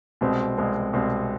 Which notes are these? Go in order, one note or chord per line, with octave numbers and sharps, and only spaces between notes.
C2 B2 G#3 C4
C2 B2 G#3 C4
C2 B2 G#3 C4